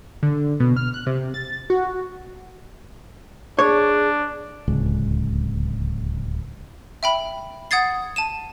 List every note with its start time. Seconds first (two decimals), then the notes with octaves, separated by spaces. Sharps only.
0.23 D3
0.60 B2
0.76 F6
0.94 F#6
1.07 C3
1.34 A6
1.70 F#4
3.59 D4 G#4 C#5
4.68 D1 C#2
7.03 E5 G5 B5
7.71 F#5 D#6 G#6 A6 C7
8.16 A5 D#7 E7